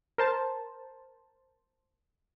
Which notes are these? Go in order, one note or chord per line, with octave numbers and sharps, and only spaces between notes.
A#4 C5 A5